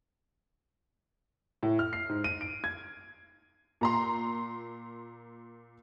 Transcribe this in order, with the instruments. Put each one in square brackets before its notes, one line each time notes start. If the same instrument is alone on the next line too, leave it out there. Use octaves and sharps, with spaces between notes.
[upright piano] A2
F6
C7
G#2
D#7
D7
G#6
[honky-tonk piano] A#2 A#5 C6